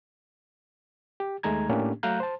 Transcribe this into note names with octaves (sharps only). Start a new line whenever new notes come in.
G4
D#2 G#3 A3 D#4 A#5 G#6
A2 A#3 C#4 D4 G4
F#3 A3 F5 A#5 F#6 G6
C5 A5